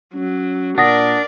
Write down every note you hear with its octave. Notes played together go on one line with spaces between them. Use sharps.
F#3 C#4
A#2 D4 A#4 D5 F#5 D#6 A#6